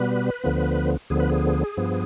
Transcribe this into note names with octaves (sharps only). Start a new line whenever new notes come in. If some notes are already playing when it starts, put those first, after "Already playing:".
Already playing: B2 G3 B3 B4
D2 D3 F3 B3
D2 D3 F3 B3 G#4
B4
G#4
G2 F3 B3